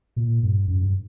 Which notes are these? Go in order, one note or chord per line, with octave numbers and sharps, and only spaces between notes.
A#2
G2
F#2
G2